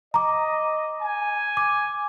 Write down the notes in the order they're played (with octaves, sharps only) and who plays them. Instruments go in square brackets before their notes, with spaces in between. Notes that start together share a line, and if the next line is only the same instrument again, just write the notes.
[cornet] D#5 [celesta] A#5 D6
[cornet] G#5
[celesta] D6